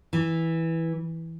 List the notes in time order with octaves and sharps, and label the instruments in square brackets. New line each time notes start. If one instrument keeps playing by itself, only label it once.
[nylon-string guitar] E3